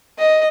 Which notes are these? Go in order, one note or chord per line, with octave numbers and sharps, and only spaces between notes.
D#5